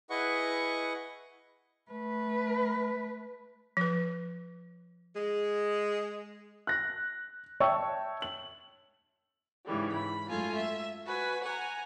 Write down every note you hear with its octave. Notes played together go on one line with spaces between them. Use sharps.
E4 G#4 B4 D#5 F#5 C#6
A3 B4
F3 B4
G#3
F#6 A#6
C#5 E5 G5 A5 C#6 E6
F#7
G#2 C#3 E3 G3
B5
F#2 G#3 A3 F4 G#5
E5
F#4 B4 G#5
F#5 G#5 A#5